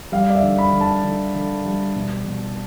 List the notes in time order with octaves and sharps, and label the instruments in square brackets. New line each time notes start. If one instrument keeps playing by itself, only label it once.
[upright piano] G3 F5
D5
E5
D3
B5
D3
A5
D3
D3
G3
B2
B2